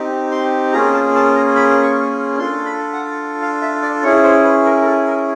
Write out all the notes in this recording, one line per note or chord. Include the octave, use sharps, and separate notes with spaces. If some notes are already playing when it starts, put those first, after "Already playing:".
Already playing: C4 D#4 G4
C6
A#3 C#4 F4 G#4 A#5
A5
A5
A#5
B5
C#6
D4 F4 A4 C6
B5
F#5
F5
E5
D5
C#4 E4 G#4 C#5
C5
B4
A#4
A#4
A4
A#4